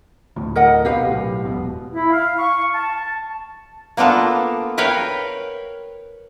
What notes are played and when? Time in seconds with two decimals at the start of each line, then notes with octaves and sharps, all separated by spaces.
0.36 D2 A2
0.56 A#4 D#5 F#5
0.85 B1 B2 G4 B4 F5
1.06 B1 A2
1.45 E1 B2
1.94 E4
2.11 F5
2.38 C#6
2.75 A5
3.97 A#3 B3 D4 F4 A4
4.78 A#4 B4 C#5 F5 G5